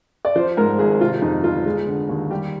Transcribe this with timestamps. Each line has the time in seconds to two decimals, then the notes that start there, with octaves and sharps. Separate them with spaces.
0.25 D5
0.36 F3 C5
0.57 G#2 A#4
0.79 G#1 G#4
1.00 C3 F4
1.22 F2 D#4
1.44 G1 F4
1.66 G#3
1.88 D3
2.09 D#2
2.31 G3 G4